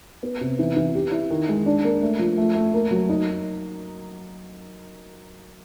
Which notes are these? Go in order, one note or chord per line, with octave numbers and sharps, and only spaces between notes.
B3
C3
E3
E3
G4
E4
D#3
G#3
D4
A#3
A3
F3
A3
A3
A#3
F#3
D#4